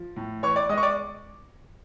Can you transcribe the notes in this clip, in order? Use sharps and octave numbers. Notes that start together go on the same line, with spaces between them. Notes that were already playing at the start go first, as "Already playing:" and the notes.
Already playing: F3
A2
E3 C#5 C#6
D5 D6
G#3 D#5 D#6
C#6
D5 D6